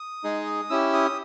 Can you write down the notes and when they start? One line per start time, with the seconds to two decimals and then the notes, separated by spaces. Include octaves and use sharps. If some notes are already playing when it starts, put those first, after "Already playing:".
Already playing: D#6
0.24 G#3 D#4 G#4
0.70 C#4 E4 G4 E6
0.93 D#6